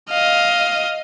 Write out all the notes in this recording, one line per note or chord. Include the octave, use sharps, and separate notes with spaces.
D#5 F5